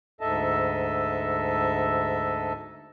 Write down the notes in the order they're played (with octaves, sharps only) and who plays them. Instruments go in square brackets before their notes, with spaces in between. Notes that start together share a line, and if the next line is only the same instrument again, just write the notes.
[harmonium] D2 G#2 A4 D#5 E5 A5